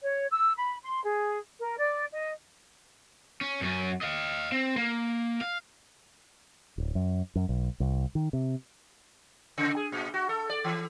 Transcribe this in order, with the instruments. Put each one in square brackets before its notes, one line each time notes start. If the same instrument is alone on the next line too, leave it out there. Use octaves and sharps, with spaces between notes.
[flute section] C#5
E6
B5
C6
G#4
A#4
D5
D#5
[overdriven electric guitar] C#4
F#2 C#4
D#5 F5
C4
A#3
F5
[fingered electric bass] D1
F#2
F#2
B1
C2
D#3
C3
[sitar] C#3
G#4
A#2
F#4
A4
D5
E3